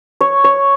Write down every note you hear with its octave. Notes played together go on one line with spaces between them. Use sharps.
C#5
C#5